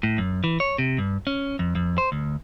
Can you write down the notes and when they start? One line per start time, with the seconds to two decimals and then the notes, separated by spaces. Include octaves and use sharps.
0.03 A2
0.18 F#2
0.44 E3
0.60 C#5
0.78 C3
0.98 G2
1.27 C#4
1.59 F2
1.75 F2
1.98 C5
2.12 D2